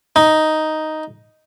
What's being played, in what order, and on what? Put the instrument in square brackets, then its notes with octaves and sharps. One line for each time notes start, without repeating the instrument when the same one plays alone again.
[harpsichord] D#4